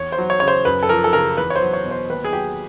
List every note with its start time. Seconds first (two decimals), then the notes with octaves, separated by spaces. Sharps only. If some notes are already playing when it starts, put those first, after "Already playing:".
Already playing: E2 C#5
0.12 C5
0.18 F#3
0.30 C#5
0.40 C#3 C#5
0.48 C5
0.65 F#2 B4
0.83 A4
0.89 F3 A#4
1.04 A4
1.13 C#3 A#4
1.37 E2 B4
1.50 C#5
1.56 C5
1.62 F#3
1.73 C#5
1.85 B2
1.91 C5
2.10 D#2 B4
2.25 G#4
2.33 F#3 G4